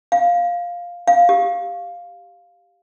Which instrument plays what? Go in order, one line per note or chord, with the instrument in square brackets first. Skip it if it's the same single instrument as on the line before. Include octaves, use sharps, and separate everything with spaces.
[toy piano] F5
F5
G4